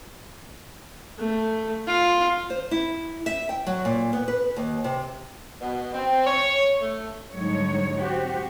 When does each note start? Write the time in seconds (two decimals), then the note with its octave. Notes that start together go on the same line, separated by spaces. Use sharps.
1.19 A3
1.87 F4
2.50 C5
2.71 E4
3.26 E5
3.49 G5
3.67 F#3
3.85 A#2
4.13 B3
4.28 B4
4.57 D#2
4.84 C3
5.61 B2
5.94 C4
6.27 C#5
6.81 A3
7.33 G#2 D3 F#3 G3 D#4 C#5
7.99 C4 F#4 G4